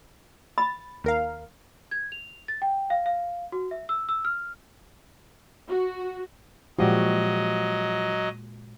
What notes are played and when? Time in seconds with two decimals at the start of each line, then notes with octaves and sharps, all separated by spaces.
0.58 B5 A6
1.04 D#2 A#4 F5
1.91 G#6
2.12 F7
2.48 A6
2.62 G5
2.90 F5
3.06 F5
3.52 F#4
3.71 E5
3.89 E6
4.09 E6
4.25 F6
5.68 F#4
6.79 A#2 F3 F#3 G#3 F#4 G4 D5 D#5